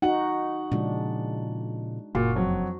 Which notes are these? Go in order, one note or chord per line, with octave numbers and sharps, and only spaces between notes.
D#4 F#4 F#5
A#2 C#3 F3 G#3 D4
F#1 A#2 F#4
F2 F#3